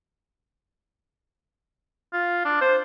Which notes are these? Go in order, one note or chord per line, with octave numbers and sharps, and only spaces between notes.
F4
D4
C5